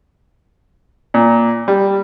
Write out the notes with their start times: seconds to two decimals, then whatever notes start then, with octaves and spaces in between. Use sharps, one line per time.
1.14 A#2
1.68 G3